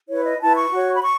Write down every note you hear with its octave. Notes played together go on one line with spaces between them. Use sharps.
E4 B4 C#5
D#5
E4 B4 A5
C#6
F#4 C#5
B5
C#6